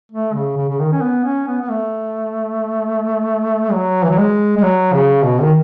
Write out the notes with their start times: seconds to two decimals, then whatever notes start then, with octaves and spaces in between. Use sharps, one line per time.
0.12 A3
0.34 C#3
0.57 C#3
0.69 C#3
0.79 D#3
0.92 C#4
1.01 B3
1.24 C#4
1.47 B3
1.61 B3
1.69 A3
3.72 F#3
4.03 E3
4.10 F#3
4.18 G#3
4.57 G#3
4.62 F#3
4.93 C#3
5.23 B2
5.41 D#3